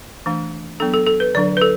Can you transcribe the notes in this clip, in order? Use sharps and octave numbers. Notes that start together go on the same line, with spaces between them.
E3 A3 D4
F#3 B3 D4 A4
A4
A4
B4
D3 F#3 D4 D5
B4
A4